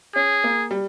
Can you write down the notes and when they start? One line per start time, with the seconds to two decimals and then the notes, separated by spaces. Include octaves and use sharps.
0.16 C#4 G#4
0.44 A#3
0.71 G3